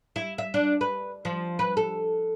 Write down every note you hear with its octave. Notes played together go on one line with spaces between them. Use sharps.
E4
E5
D4
B4
F3
B4
A4